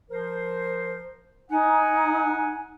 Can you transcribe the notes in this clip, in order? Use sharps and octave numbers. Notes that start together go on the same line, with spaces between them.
F3 A#4 C5
D#4 F#5 G#5